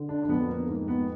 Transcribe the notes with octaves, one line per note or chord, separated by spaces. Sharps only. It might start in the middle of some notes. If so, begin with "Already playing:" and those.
Already playing: D3
D4
D4
F2 B3
A#3
G#2 A#3
B3